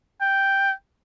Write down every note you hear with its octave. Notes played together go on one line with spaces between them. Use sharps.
G5